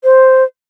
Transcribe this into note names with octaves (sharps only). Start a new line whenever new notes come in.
C5